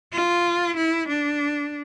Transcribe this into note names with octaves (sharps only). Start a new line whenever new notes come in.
F4
E4
D4